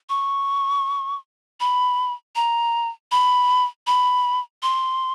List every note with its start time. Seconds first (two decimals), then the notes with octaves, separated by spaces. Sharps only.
0.09 C#6
1.60 B5
2.36 A#5
3.12 B5
3.87 B5
4.63 C6